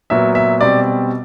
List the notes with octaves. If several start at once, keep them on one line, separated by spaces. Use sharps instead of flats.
A#2 F#3 B3 E5
E5
B2 G3 C4 D5